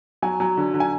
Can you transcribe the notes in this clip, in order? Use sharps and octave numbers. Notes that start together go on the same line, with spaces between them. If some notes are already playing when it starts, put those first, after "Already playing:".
F#3 G#5
F#3
D3
D3
G#5